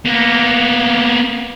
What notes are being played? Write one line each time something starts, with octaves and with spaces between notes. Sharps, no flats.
A#3 B3